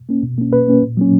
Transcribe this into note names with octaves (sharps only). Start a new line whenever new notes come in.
A#3 C#4
B2
A#3 C#4
B2 B4
A#3 C#4
A#2
F#3 A#3 C#4